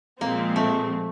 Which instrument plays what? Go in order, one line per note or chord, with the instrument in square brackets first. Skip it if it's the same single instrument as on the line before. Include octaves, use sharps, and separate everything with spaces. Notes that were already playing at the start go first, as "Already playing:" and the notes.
[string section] A#2 F3 G#3 C4 [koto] A#3
[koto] A3